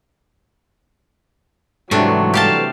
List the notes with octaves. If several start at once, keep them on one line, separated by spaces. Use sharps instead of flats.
G#2 C3 E3 F#3 G3 A3 D4 A4
G4 F5 A5